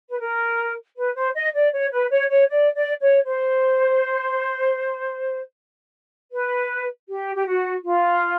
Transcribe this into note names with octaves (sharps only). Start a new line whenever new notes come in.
B4
A#4
B4
C5
D#5
D5
C#5
B4
C#5
C#5
D5
D5
C#5
C5
B4
G4
G4
F#4
F4